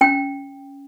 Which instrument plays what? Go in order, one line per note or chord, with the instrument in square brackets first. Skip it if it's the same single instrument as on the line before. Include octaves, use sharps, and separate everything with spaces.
[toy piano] C#4 G5